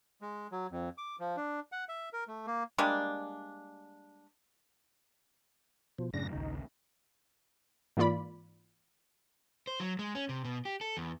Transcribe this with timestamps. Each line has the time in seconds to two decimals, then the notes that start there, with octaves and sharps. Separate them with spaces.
0.22 G#3
0.52 F#3
0.71 F2
0.98 D6
1.20 F3
1.37 D4
1.72 F#5
1.89 E5
2.13 A#4
2.28 A3
2.47 A#3
2.78 G3 G#3 A#3 D4
5.98 B2 F3
6.14 F#2 A2 C#3 D4 A#6
6.33 A#1 D#2 C#3 D#4
7.97 G#2 E3 A#3 F4 D5 B5
9.67 C5
9.80 F#3
9.99 G#3
10.15 C#4
10.29 C3
10.44 B2
10.65 G4
10.81 A4
10.97 E2